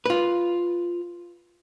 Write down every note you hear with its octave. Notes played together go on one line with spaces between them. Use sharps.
F4 B4